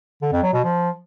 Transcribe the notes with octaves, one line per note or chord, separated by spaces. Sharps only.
D3
F2
F#3
B2
F3